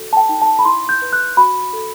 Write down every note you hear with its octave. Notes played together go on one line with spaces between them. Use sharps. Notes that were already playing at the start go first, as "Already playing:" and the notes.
Already playing: F#4 A4
A5
G5
D#4
A5
B5
E4 C6
G6
B4
F#6
F#4 B5
A4